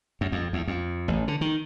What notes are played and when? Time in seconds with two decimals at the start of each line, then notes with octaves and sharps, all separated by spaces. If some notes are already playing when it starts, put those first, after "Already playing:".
0.21 F#2
0.32 F2
0.53 E2
0.68 F2
1.08 A1
1.28 D3
1.41 D#3